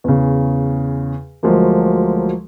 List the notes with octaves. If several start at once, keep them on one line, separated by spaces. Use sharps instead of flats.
E2 C#3
D2 F3 F#3 G#3 A#3